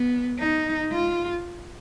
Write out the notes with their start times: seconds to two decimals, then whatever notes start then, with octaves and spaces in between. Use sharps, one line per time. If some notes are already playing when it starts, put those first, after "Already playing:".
Already playing: B3
0.40 D#4
0.92 F4